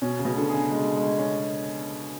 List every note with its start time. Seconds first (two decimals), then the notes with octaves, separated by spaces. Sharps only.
0.02 B2 C#4
0.19 C#3
0.25 B2
0.37 D3
0.49 G#4
0.54 C#3
0.71 G#3
0.96 G#3
1.18 C#4